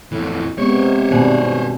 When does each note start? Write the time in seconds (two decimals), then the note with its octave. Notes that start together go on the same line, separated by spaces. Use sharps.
0.12 F2 A2 E3
0.58 C3 G#3 B3 C5 C#5
1.11 G2 B2 D#3 G#4
1.42 C3